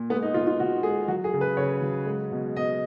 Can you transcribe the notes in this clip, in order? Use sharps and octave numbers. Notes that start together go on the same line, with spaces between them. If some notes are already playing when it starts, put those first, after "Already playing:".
Already playing: A#2
G#3 B3
D#4
B2 F4
F4
B2 F#4
G#3 G#4
F#3 F#4
G#4
C#3
B4
C#3 C#5
F#3
G#3
B2
B2 D#5